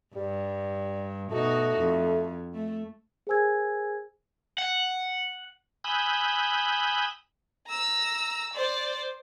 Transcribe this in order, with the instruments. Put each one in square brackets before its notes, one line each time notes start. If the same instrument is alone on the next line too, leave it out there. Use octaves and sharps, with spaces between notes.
[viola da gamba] G2 [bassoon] G3
[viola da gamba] B2 D#4 F#4 [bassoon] A3
[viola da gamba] F2
A3
[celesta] G#4 A#4 C5 G#5 E6 G#6
[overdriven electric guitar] F#5
[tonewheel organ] G#5 B5 D#6 E6 F#6 G6
[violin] A#5 E6
C5 D5